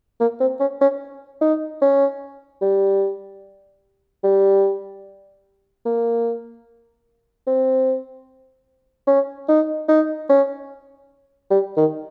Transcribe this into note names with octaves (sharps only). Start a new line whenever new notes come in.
A#3
C4
C#4
C#4
D#4
C#4
G3
G3
A#3
C4
C#4
D#4
D#4
C#4
G3
D#3